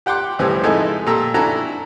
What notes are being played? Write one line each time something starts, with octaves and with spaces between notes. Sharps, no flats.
G4 F#5 G5 C6 D6
C#2 A2 E3 F3 G3
F2 G#3 D#4 E4 A4 G#5
A#2 G4 A4 A#5 E6
D4 E4 F#4 A4 G#5 A#5